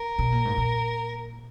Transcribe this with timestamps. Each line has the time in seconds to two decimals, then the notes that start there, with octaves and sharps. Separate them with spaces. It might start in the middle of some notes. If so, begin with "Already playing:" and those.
Already playing: A#4
0.19 B2
0.32 A#2
0.45 G#2
0.58 A#2